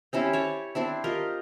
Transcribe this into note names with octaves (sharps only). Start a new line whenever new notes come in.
C4 C#4 E4 G4
C#5 A5 D6
C4 D4 E4
F4 G4 A#4 D#5